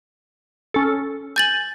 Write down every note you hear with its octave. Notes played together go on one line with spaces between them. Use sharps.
C#4 A4
G#5 G6 A6 F#7